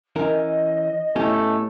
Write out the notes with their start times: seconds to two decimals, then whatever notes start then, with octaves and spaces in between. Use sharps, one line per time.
0.16 E3 C#4 A#4 D#5
1.16 A2 A3 B3 C#4 G4